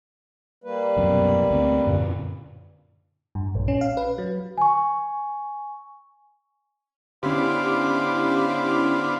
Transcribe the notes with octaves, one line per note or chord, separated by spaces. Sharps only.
G3 A#3 B4
C2 F#2 B2
D2 C4
F#2 A#2 D3
G2
A#1
C#4
F5
B4
F#3
G#5 C#6
D3 B3 C#4 E4 G4 C5 F5 D6